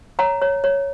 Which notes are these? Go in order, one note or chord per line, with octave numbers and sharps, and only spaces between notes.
C#5 F#5 A#5
C#5
C#5